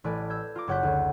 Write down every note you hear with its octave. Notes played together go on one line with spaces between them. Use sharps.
A1 A3 B4 D5 G#5
E6 G6 G#6
F4 A#5 D6
F#1 C#5 F#5 F#6 G6 B6
D2 C#5